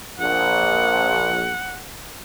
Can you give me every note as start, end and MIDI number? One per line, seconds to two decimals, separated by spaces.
0.19 1.52 34
0.19 1.81 78